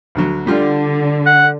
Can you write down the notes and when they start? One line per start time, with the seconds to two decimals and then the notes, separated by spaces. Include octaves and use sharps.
0.15 D2 D3 F#3
0.47 D3 G3 F4
1.26 F#5